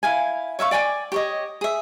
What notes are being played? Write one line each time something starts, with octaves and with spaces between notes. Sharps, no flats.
E4 F5 G#5
C#5 E5 F5 C#6
D5 G5 G#5 D6
G4 C#5 D#5
G#4 E5